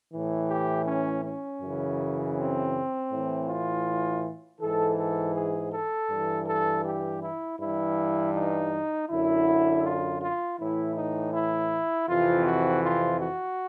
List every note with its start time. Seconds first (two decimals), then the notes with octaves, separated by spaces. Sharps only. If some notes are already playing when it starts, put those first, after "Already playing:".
0.12 A2 E3
0.49 G4
0.86 C#4
1.24 C#4
1.62 F#2 C#3 E3
2.36 C4
3.11 A2 E3
3.48 F4
4.61 G#2 E3 A4
4.98 A4
5.35 G#4
5.73 A4
6.10 G2 E3
6.47 A4
6.85 G4
7.22 E4
7.60 G2 E3 E4
8.34 D#4
9.09 F#2 D3 E4
9.84 F4
10.22 F4
10.59 A2 E3 E4
10.96 D#4
11.34 E4
12.08 F2 C3 E3 F4
12.45 F#4
12.83 F4
13.20 F#4